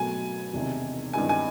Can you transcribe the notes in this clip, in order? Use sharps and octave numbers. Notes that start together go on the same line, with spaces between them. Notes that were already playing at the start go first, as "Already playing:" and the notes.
Already playing: B2 F#3 A3 G#5
E1 E2 C3 D#3
G2 D#3 G#3 C4 E4 G#5
G#5